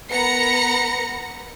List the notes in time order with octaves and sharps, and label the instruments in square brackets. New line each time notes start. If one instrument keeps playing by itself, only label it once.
[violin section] B3 A#4 A#5 B5 A#6 C#7